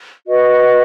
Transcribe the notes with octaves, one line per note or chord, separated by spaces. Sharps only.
F#4 B4 D#5